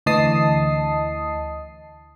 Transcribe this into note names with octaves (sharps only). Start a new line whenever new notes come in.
D2 E3 D#5 A5 D#6 C7